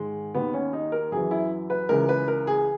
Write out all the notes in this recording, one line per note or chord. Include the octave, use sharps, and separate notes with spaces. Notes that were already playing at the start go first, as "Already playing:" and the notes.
Already playing: G#2 D#3 G#3
D#2 D#3 B3
C#4
D#4
A#4
F#2 E3 G#4
E4
B4
C#2 C#3 E3 A#4
B4
A#4
G#4